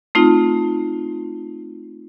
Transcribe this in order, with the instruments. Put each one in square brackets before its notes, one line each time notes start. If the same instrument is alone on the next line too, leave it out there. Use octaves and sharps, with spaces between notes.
[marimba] A3 C4 D#4 F4